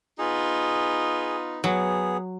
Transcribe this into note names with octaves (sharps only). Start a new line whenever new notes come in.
B3 D#4 F4 G#4
F#3 B3 G#4